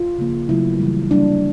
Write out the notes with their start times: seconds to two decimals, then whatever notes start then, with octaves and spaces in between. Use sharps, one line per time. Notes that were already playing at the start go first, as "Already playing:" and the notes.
Already playing: F4
0.19 C#3 F3 A#3
0.49 C#3 F#3 A3 E4
0.79 C#3 E3 G3
1.10 D3 G3 A#3 D4